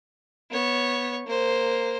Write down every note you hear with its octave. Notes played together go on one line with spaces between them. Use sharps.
B3 C#5
A#3 C5